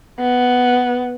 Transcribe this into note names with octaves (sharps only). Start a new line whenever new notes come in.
B3